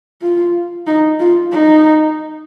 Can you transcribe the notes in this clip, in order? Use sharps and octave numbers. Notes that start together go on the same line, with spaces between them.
F4
D#4
F4
D#4